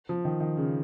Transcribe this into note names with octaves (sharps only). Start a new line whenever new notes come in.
F3
D#3
D#3
C#3